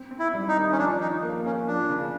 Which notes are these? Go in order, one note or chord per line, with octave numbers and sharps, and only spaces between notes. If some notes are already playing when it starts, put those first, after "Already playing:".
Already playing: C4
C4
E4
G3
D#4
D#3
C#4
F3 D4
F3 D#4
A#3
A#3 C#4
F3 D4
C#3